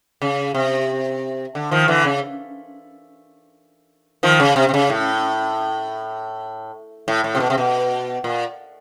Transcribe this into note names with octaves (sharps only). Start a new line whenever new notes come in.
C#3
C3
D3
D#3 F3
D3 E3
C#3
D#3 F3
C#3
C3
C3
C#3
A2
A2
A2
C3
B2
C3
B2
A#2